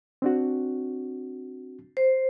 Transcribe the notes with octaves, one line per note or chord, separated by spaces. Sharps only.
C4 D4 F#4
C5